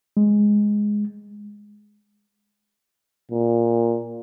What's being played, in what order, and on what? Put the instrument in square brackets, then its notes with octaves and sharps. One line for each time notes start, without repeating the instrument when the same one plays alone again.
[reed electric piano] G#3
[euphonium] A#2